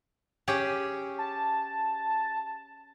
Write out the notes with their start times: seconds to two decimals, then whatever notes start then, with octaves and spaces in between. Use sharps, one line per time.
0.48 C#4 G4 G#4
1.19 A5